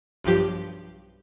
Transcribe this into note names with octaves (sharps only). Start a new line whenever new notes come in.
B1 G2 F3 G4